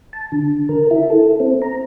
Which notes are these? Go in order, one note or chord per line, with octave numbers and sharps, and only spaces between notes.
A5
D3
A#4
E4
A4
C4
A#5